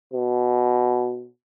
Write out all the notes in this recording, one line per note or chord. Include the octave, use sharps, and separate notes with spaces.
B2